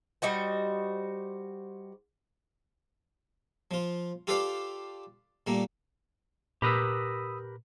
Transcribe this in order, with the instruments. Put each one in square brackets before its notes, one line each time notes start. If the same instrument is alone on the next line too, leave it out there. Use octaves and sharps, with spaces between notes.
[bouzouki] G3 D#4 F#4 C5
[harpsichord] F3 F4
F4 G4 A4 B4 D5 F5
A#2 G3 A3 A#3
[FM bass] A#2 [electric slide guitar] G4 A#4 B4 [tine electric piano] B5 D#6 E6